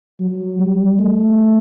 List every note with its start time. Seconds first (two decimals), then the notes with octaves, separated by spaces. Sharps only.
0.20 F#3
0.59 G3
0.99 A3